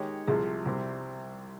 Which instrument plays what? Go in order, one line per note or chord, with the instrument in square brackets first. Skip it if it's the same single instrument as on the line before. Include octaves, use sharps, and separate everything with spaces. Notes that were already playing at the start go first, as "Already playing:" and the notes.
Already playing: [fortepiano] D#3 G#3 D#4 G4 C#5
[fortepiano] C2 C3 F3 [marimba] G#4
[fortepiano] C2 C3 G3 C4 G4